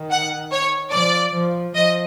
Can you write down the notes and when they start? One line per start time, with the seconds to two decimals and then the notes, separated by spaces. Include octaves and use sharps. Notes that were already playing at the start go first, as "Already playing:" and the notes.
Already playing: D#3
0.11 F#5
0.52 C#5
0.93 F3 D5
1.34 F3
1.75 F3 D#5